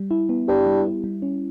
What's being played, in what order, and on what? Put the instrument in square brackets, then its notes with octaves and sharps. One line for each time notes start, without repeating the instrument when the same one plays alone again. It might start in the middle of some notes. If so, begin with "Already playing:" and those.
Already playing: [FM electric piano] G3
E4
B3
[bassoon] G2 [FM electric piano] G4
[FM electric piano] G3
E4
G3
C#4